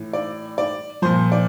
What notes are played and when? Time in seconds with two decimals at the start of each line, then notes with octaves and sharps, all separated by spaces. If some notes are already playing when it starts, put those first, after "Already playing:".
Already playing: A2 E3
0.13 D5
0.58 D5
1.02 A#2 F3 C5
1.32 D5